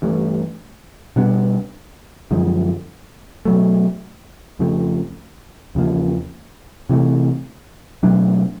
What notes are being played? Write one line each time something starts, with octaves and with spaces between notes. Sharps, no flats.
G2 E3 A3
B2 G3 B3 D4
F#2 D3 F3 G#3
B2 F#3 A3
F2 C#3 F3 A3
E2 C#3 F3 A#3
C3 E3 A3
B2 F#3 A3 D4